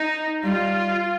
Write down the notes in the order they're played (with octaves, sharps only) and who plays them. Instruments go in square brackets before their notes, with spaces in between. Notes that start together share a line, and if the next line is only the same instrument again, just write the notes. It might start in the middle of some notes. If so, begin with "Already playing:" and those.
Already playing: [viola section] D#4
[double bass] G3 [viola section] F4